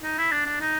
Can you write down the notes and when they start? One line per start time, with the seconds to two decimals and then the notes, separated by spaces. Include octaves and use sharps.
0.03 D#4
0.18 E4
0.31 D4
0.46 D4
0.61 D#4